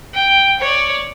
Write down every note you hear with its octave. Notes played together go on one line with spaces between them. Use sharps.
G5
C#5 D5